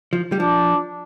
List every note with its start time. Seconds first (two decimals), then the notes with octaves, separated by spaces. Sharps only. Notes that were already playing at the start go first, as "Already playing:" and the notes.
0.13 F3
0.32 G3
0.40 F3 D4